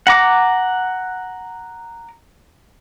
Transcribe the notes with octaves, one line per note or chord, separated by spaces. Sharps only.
F#5 A#5 D6